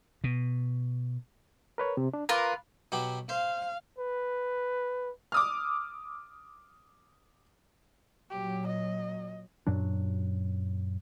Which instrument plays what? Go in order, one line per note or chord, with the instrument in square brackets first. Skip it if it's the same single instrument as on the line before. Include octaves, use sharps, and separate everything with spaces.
[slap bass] B2
[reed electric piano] A#4 B4 C#5
C3
D4
[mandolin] F4 A#4 B4 [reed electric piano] A#5 C6 D6
[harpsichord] B2 F#3 G4
[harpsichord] C5 [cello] F5
[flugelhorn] B4
[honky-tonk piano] D6 D#6 F6
[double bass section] A#2 F#3 [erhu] G4
[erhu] D#5
[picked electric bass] F#2 A#2 F#3 D4